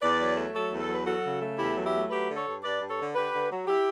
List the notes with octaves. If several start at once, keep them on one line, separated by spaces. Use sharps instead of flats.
E2 B4 D5
F#3
A3
F#3 A4 C#5
E2
A4
F#3 B4
F#3 F#4 A4
C#3
A3
E2 E4 G4
F#3
E4 G4
A3
F#3 G4 B4
D3
A4 C#5
G2
G2 B4 D5
G2
A4 C#5
D3
D3 G4 B4
D3
F#3
E4 G4